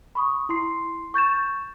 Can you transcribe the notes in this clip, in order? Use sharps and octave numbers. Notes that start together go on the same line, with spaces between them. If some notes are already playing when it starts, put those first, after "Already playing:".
B5 C#6 D#6
E4 C6 C7
C#6 G6 A6 E7